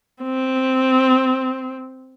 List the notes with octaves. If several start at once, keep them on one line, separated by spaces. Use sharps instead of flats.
C4